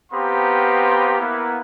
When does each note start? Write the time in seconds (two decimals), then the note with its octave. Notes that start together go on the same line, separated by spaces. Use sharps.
0.12 B3 C4 G4 F5 A#5 C6
1.19 A#3 B3 E4